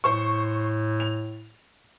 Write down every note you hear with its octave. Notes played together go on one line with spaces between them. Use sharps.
A2 C5 C#6
F7